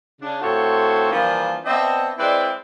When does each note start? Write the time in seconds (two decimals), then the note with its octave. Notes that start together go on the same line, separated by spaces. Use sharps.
0.21 C#3 D4
0.41 A2 C4 F4 F#4 A4 C#5
1.10 E3 F3 G3 A#3 D4
1.65 B3 C4 D4 D#5 E5
2.18 G#3 C4 E4 B4 D5